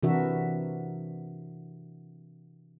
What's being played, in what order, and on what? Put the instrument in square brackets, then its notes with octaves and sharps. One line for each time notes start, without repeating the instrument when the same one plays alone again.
[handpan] C3 E3 D4 F#4 A#4 E5